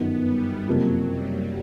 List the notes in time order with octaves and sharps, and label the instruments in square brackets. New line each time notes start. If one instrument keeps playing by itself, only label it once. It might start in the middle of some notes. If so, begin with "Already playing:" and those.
Already playing: [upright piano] G1 F#2 D#3 [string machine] B3
[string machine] G3
[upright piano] F#1 F2 C3 F3 A#3 [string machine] F#3
[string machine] G3